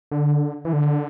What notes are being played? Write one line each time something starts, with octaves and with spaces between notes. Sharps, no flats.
D3
E3
D3